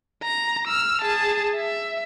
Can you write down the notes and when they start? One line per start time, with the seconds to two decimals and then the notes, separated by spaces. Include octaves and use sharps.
0.24 A#5
0.68 E6 F6
1.02 G#4 A5
1.56 E5